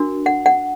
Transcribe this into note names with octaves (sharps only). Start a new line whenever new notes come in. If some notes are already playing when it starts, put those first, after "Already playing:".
Already playing: D4 F#4 A#4
F#5
F#5